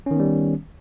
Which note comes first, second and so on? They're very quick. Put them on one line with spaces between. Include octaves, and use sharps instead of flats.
C#4 D#3 B3 G3